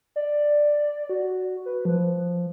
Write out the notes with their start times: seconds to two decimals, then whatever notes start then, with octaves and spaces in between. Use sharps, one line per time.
0.16 D5
1.10 F#4
1.66 B4
1.85 F3